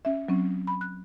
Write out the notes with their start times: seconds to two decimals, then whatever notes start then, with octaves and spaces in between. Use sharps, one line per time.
0.05 C#4 E5
0.28 F#3 C4 C#4
0.67 B5
0.81 F#6